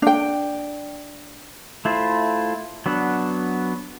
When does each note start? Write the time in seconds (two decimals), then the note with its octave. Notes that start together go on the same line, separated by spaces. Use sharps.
0.02 D4 G5
1.85 A3 E4 F4 C5
2.86 F#3 B3 D4 F#5